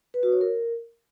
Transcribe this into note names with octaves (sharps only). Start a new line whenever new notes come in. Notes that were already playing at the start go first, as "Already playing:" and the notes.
B4
F#4
C#5
A#4